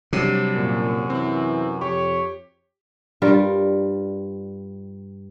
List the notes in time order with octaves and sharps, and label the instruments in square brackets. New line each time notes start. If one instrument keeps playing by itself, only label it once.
[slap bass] C3 [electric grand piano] F#3 G3 D4
[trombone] F#2 [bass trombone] A#2
[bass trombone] E3 [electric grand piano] C4
[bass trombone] F2 [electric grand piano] G4 [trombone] C#5
[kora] G2 G3 F4 A#4